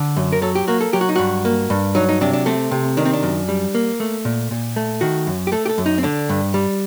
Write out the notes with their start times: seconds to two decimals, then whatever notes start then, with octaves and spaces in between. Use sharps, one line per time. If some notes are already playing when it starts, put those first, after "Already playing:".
Already playing: D3
0.16 F#2
0.32 A#4
0.42 F#3 A4
0.55 G4
0.68 A#3 F#4
0.81 A4
0.93 F#3 G4
1.01 F#4
1.09 D#4
1.16 G2 F#4
1.45 A#3
1.70 G2
1.95 F#3 D#4
2.09 D#4
2.21 C3 D4
2.33 D4
2.46 A3 C4
2.71 C3
2.97 D#3 D4
3.05 C4
3.14 D4
3.23 F#2
3.48 G3
3.75 A#3
4.00 A3
4.25 A#2
4.51 A#2
4.76 A3
5.01 D#3 F#4
5.27 F#2
5.47 G4
5.52 A3 A4
5.66 G4
5.69 A4
5.78 F#2
5.86 D#4
5.98 C4
6.03 D3 D4
6.29 G2
6.54 G3